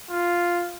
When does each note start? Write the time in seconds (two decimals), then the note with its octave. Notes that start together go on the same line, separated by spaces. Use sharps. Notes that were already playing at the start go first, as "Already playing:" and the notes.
0.10 F4